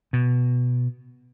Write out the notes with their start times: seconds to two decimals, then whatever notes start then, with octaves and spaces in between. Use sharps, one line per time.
0.13 B2